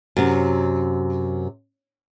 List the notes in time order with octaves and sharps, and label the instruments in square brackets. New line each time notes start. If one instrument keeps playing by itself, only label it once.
[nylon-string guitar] F#2 C3